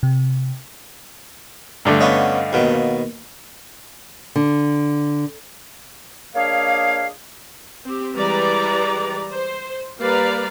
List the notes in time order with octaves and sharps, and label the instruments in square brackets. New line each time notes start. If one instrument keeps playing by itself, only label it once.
[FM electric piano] C3
[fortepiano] G2 D3 A3
[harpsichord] B3 C#4 [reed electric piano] D#5 F5 F#5
[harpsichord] D#2 B2
[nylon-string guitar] D3
[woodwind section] A#3 D4 G#4 C#5 D#5 F5
[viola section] C4 G4
E3 G3 G#3 B4 D5 A#5
C5
G3 A#3 B4 D5 F5 A#5